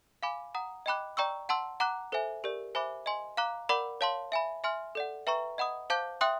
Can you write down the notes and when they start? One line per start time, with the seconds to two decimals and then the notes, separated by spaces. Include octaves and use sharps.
0.23 F5 G#5 B5 D6
0.55 F#5 A#5 D#6
0.86 D#5 G5 B5 D6 F#6
1.17 D5 G5 A#5 C#6 E6
1.49 F#5 A5 C6 E6
1.80 F#5 A#5 D6 F#6
2.12 A4 C5 E5 G#5
2.44 G4 A#4 D5
2.75 C5 E5 G#5 B5 D6
3.06 D#5 G#5 C6
3.37 F5 A#5 D6 F#6
3.69 A#4 D5 F#5 B5 D6
4.01 C#5 F5 A5 C6
4.32 E5 G#5 B5
4.64 E5 G#5 C6 F6
4.95 A4 D5 F#5
5.27 B4 E5 G5 A#5 C#6
5.58 D#5 F#5 B5 D#6
5.90 C5 F5 A5 D6 G6
6.21 E5 G5 C6 D#6 F#6